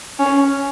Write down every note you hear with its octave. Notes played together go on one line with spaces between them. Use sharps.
C#4